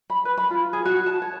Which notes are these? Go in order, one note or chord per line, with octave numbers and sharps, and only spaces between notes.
B5
B4
B5
F4
G#4
F#4
A5
C#5